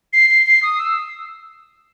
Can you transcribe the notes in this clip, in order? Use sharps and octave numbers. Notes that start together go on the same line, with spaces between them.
C7
C7
C7
D#6
E6